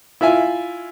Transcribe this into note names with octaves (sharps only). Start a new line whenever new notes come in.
E4 F4 E5 G#5